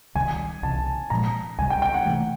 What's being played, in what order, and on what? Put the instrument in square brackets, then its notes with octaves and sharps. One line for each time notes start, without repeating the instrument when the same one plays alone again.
[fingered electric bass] C#2 C3 D#3 G3 [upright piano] G#5
[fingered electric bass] C2 C3 E3 [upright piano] A5
[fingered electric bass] A#2 F3 G#3 [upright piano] A#5
[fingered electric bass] C#2 C3 D#3 G3 [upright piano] G#5
[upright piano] G5
G5
F#5
[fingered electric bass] C3 E3 A3